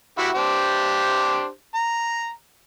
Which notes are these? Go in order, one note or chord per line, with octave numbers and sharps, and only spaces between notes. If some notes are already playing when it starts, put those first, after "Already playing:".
E4 F#4 G4
D4 G4 C5
A#5